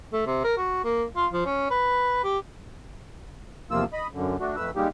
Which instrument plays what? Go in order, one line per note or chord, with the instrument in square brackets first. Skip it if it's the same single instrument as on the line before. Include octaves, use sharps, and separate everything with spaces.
[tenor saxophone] A3
C3
A#4
F#4
A#3
F4
F3
C#4
B4
G4
[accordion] E2 C3 F3 A#3 F4 E6
D#5 B5
F#2 D3
A3 D4 F#4
F2 A3 B4 E6
G3 G#3 A#3 D#4 G4